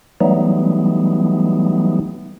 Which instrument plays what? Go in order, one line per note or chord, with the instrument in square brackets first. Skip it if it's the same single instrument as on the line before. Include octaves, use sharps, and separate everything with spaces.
[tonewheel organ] E3 F#3 G3 A3 B3 D#4